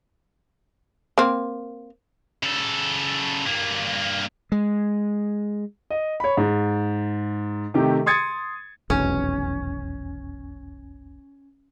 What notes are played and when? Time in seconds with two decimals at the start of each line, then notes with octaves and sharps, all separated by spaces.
1.18 A#3 C4
2.43 C#3 A4
3.46 G2 A#3
4.52 G#3
5.90 D#5
6.20 C#5 B5
6.37 G#2
7.74 C3 D#3 A3 G4
8.06 C6 D#6 G#6 A6 C#7
8.90 F1 B1 E2 C#4